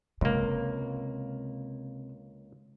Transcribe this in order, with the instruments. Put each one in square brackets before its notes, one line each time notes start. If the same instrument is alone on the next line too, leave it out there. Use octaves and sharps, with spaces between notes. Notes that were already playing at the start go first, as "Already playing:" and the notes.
[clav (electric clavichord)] C#2 A#3 [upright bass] C3